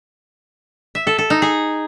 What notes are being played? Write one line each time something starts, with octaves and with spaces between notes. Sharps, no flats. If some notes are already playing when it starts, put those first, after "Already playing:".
E5
A4
A4
D#4
G#4